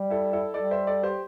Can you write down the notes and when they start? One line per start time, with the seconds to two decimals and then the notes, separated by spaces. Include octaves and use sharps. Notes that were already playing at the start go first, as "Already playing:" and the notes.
Already playing: G3
0.10 E4 A4
0.33 E4 A4
0.54 G3 A4 D5
0.71 C5 E5
0.87 A4 D5
1.03 G4 C5